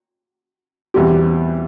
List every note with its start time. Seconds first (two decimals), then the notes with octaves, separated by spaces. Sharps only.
0.94 E2 B2 G3 C4 G4